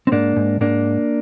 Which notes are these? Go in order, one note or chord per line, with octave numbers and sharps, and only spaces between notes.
C4
G#2 A#3 D4
G#2
G#2 A#3 D4